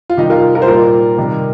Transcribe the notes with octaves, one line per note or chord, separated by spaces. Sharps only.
F4
C3 D#3 G3 D#4 G4
F4 A#4
F4 A#4
C5
A#2 G3 F4 A#4
C3 D#3 G3